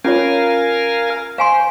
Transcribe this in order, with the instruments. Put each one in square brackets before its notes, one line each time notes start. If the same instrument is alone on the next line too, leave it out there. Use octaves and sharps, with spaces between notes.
[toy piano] C#4 F4 C#5 [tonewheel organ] A#4 F5 G#5
[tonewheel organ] C5 [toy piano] F5 G#5 C6